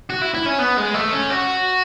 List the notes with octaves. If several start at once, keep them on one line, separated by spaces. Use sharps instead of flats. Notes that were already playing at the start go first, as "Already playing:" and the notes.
F#4
E4
E4
C#4
B3
G#3
A3
C#4
F#4